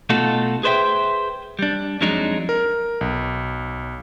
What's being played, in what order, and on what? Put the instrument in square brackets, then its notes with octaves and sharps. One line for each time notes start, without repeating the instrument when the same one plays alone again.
[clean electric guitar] B2 A3 D#4 F4 F#4 A4
G#4 B4 C5 D5 E5 G5
G3 D4
F2 F#3 G#3 D4 D#4
[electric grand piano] A#4
B1